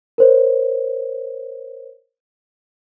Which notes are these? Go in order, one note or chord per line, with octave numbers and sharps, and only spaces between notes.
A#4 C5 C#5